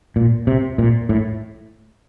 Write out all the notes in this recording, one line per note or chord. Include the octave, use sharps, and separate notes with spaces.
A#2
C3
A#2
A2